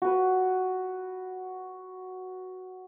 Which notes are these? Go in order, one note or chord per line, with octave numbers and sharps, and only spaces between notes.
F#4 B4